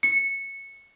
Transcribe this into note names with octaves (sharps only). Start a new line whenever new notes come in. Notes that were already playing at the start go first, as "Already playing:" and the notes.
C#7